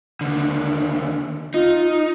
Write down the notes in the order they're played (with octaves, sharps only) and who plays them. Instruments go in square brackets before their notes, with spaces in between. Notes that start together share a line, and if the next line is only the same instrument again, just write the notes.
[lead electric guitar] D#2 D3
[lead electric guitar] D#4 [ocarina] F4